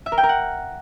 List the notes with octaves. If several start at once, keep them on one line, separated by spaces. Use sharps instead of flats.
E5
A#4
G5
A#4
F#5